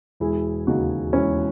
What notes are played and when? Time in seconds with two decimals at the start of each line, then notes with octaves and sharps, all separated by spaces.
0.20 E1 E4 G#4
0.67 D#2 C#3 D#4 F#4
1.13 E1 C#4 E4